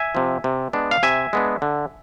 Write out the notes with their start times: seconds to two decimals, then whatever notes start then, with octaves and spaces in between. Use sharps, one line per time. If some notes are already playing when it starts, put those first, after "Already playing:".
Already playing: E5 G#5
0.15 C3 F3
0.44 C3
0.73 G#3 B3 D4
0.91 F5
1.03 C3 E5 G#5
1.33 G#3 B3 D4
1.62 D3